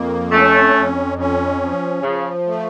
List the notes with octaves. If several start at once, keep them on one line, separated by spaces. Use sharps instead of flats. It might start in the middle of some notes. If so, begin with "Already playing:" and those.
Already playing: F2 A#3
A3 C#4
F2
C#4
F3
C#3 F3
A3